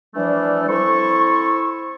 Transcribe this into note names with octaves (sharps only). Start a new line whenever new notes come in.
E3 F3 G3 A3 D4
C4 E4 A4 C#6